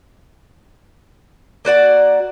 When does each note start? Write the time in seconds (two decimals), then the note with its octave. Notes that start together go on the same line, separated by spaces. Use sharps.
1.65 A#3 F#4 D5 F#5